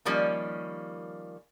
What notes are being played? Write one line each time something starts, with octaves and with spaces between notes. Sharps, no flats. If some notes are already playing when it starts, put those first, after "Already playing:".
D#3 F3 G3 A#3 C#4